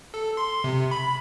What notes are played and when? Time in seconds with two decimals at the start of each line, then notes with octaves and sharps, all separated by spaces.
0.14 A4
0.37 C6
0.64 C3
0.91 B5